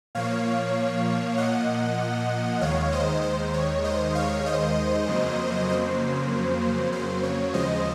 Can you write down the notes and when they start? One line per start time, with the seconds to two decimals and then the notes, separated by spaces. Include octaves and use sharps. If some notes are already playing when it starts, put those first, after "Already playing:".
0.15 A#2 F3 A#3 C#5 F5
1.37 D#5 F#5
2.61 D#2 D#3 G#3 C#5 F5
2.92 C5 D#5
3.23 C5
3.54 C#5
3.84 C5 D#5
4.15 C#5 F5
4.46 C5 D#5
5.08 F2 C#3 F#3 A#3
5.69 C5
6.92 C5
7.23 C#5
7.54 D#2 C#3 F3 G#3 C5 D#5